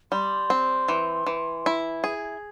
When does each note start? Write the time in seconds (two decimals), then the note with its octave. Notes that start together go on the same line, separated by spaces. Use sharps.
0.12 G3 C6
0.50 C4
0.88 E3
1.26 E3
1.66 E4
2.04 G#4